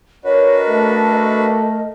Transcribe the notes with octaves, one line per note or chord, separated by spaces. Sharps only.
D4 F#4 A#4 B4 C#5 D#5
A3 A4